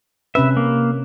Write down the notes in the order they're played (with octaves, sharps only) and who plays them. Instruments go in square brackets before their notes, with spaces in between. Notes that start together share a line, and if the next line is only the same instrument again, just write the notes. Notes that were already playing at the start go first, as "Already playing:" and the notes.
[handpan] C3 C#4 B4 [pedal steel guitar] E5
[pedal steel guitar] A#3